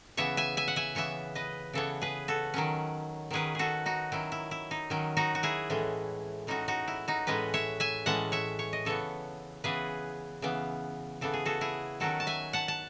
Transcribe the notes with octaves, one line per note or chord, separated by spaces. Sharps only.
C#3 E3 B3 C#5 E5
E5 G#5
E5 G#5
F#5
E5 G#5
C#3 E3 B3 C#5 E5
B4 D#5
C#3 E3 B3 A4 C#5
G#4 B4
F#4 A4
D#3 F#3 C#4
D#3 F#3 C#4 G#4 B4
F#4 G#4 A4
D#4 F#4
D#3 F#3 C#4 E4
E4
E4
D#4
D#3 F#3 C#4
D#4 F#4
F#4
E4 G#4
A2 E3 G#3 C#4
A2 E3 G#3 C#4 D#4 F#4
D#4 F#4
E4
D#4 F#4
A2 E3 G#3 C#4 B4 D#5
C#5 E5
E5 G#5
A2 E3 G#3 C#4 F#5 A5
C#5 E5
C#5
D#5
C#3 E3 B3 A4 C#5
C#3 E3 B3 G#4 B4
C#3 E3 B3
C#3 E3 B3 A4
G#4
F#4 A4
E4 G#4
D#3 F#3 C#4 F#4 A4
A5
E5 G#5
F#5 A5
A5